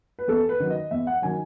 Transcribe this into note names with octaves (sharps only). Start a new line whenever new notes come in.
B4
E2 A4
B4
D#3 F#3
D#5
E2 E5
F#5
D#3 F#3 G#5